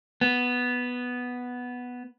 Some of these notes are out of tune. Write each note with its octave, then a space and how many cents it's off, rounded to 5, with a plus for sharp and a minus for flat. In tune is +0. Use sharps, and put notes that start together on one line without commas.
B3 +0